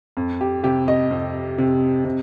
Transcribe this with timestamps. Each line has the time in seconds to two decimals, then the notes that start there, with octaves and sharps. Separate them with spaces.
0.17 F2
0.41 G4
0.63 C3 G4
0.88 D#5
1.11 F2
1.58 C3
2.05 C3